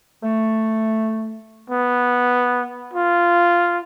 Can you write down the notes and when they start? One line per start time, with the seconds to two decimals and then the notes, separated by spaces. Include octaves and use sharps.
0.23 A3
1.70 B3
2.93 F4